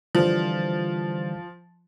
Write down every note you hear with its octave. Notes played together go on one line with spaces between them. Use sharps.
D3 E3 F3 G3